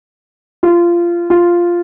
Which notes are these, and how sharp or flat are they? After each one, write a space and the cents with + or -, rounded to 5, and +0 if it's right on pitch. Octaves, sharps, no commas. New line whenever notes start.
F4 -20
F4 -5